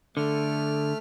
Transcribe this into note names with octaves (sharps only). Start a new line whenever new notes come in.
D3 A3 F6